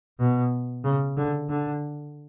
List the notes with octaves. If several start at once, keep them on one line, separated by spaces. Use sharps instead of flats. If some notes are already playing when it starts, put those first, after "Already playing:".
B2
C#3
D3
D3